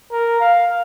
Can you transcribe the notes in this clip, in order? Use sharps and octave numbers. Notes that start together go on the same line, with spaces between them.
A#4
F5